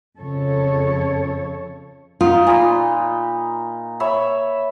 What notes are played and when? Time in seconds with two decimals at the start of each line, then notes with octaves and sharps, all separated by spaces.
0.17 F2 C#3 A4 C#5
2.21 D#4 F4
2.47 A#2 D#5 B5
4.00 C#5 E5 B5